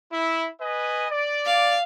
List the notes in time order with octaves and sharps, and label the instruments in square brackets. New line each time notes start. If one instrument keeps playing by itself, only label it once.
[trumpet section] E4
B4 D#5 G#5
D5
[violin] F5